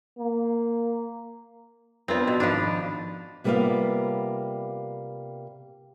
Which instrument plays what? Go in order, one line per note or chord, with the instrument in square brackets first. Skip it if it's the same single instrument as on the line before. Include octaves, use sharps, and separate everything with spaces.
[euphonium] A#3
[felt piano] F2 B3 D4 [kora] C4 F4
[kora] B2
[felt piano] G#1 B5 [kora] F3 D4
[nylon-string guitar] C3 G3 A#3 B3 F4 F5